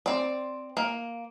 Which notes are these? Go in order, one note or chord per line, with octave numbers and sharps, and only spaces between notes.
C4 D5
A#3